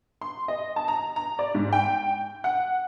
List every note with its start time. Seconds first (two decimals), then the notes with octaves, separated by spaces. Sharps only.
0.21 C6
0.48 D#5
0.76 A5
0.88 A#5
1.16 A#5
1.39 D5
1.55 G#2
1.73 G5
2.44 F#5